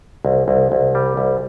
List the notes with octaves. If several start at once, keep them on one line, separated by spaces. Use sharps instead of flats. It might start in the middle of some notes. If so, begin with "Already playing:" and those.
C2
C2
C2
G3
C2